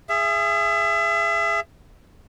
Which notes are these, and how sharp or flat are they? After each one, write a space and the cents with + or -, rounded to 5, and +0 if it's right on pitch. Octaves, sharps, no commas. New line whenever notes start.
G#4 -5 E5 +30